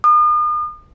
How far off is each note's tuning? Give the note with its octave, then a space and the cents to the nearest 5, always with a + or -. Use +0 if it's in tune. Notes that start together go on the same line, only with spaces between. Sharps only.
D#6 -40